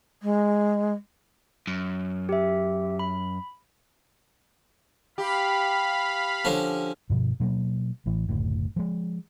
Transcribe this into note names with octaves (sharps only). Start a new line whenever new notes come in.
G#3
F#2
G4 E5
B5
G4 F5 B5
D3 F3 C#4
G2 B2 F3
B2 F#3 A3 A#3
A1 A2 E3
F#1 D2 A2
F3 G#3